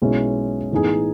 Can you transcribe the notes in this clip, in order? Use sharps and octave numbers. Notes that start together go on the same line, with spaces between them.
B1 B2 G#3 C#4 E4
A2 E3 B3 D#4 G#4